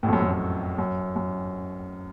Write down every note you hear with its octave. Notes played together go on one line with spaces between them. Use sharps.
A1 A2
F2
F#2
F2
F#2
F#2
F#2